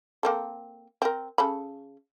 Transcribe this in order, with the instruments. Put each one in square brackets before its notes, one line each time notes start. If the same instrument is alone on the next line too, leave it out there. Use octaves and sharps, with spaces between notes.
[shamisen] A#3 C4 A4
C4 A#4
C#3 A4 B5